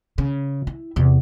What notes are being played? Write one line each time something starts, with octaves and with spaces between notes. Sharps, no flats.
C#3
E4
E2 C3